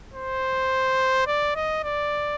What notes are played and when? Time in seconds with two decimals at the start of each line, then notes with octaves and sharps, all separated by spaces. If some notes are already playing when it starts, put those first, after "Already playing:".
0.14 C5
1.27 D5
1.55 D#5
1.84 D5